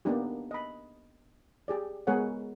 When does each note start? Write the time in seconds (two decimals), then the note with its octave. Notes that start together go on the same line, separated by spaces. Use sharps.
0.05 A#3 B3 D4 D#4 G4
0.51 D#5 B5
1.68 G4 G#4 D5
2.07 G#3 B3 G#4 A#4 C#5 F#5